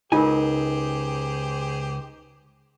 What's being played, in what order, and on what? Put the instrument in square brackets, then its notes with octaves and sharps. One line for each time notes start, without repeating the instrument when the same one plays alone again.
[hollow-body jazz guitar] C#2 G#5 [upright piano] D#4 [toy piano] F4 A#4 [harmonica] G4 G#4 C5